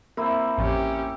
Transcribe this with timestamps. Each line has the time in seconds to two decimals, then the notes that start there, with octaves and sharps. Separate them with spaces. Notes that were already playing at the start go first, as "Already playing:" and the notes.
0.17 A#3 C4 E4
0.58 A1 F2 C#4 G4